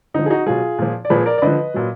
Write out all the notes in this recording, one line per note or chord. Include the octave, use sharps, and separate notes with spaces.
D3 F3 D#4
G#4
D#4 F#4
B2 F#3 F4 G#4
A#2 F3
D5
A#2 F3 G#4 B4
A#4 D5
D5
D3 F3 B4 D#5
A#2 F#3